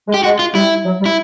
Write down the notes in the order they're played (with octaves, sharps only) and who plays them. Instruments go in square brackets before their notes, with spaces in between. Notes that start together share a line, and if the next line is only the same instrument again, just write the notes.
[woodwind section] G#3
[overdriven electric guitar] G4
[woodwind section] G#3 [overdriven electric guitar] F#4
[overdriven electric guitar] F4
[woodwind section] G3 [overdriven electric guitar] E4
[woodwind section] F#3
G3
[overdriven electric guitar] E4